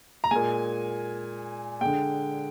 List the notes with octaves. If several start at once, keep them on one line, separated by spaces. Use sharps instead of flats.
A#5
A#2 G#3 G#5
D3 G#3 G5